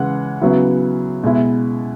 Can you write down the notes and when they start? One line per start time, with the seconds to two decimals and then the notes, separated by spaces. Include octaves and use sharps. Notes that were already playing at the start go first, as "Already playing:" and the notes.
Already playing: C#3 E3 G#3 F#5
0.41 C#3 F#3 B3 E4
1.24 B2 G#3 E4